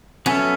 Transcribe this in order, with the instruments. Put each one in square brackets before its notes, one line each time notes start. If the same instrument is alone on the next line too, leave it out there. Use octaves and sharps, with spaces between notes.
[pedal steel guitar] F#3 B3 A4 E5 [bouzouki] C#4